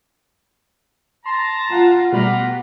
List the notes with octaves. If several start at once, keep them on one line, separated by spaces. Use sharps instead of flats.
A5 A#5 C6
F4 F#5
B2 G3 A3 B3 F4 G4 A#5 B5